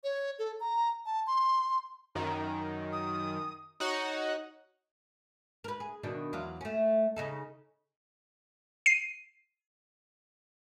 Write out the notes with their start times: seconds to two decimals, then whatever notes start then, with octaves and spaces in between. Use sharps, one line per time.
0.04 C#5
0.39 A4
0.60 A#5
1.06 A5
1.27 C6
2.15 F#2 D#3 A#5
2.92 D#6
3.80 D#4 F#4 C#5 F#5
5.64 A#4 B4
5.80 G#4
6.03 B2 D#3 D4
6.33 E2 F#3 F4
6.61 A3 C#4
7.16 C#3 D#4 A4
8.86 C7 D#7